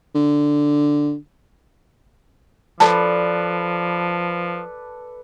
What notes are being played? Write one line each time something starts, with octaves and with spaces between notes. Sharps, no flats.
D3
F3 A4 B4 D5 A5